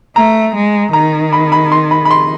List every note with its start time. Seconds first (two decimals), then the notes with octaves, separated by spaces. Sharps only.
0.16 A3 A#5
0.55 G#3
0.93 D#3 A#5
1.33 B5
1.52 B5
1.72 C6
1.91 B5
2.05 B5
2.11 C6